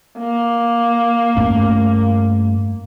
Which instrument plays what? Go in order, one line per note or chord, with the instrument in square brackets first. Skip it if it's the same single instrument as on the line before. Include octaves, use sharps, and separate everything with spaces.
[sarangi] A#3
[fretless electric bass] G2 A3 C#4